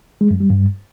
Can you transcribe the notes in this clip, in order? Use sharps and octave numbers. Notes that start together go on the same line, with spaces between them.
G#3
F#2
G3
G2